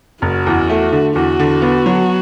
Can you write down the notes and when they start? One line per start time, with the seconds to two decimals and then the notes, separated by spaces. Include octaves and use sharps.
0.22 F#1 F#4
0.46 E2
0.70 A3
0.92 D3
1.15 E2 F#4
1.40 D3
1.62 B3
1.86 F#3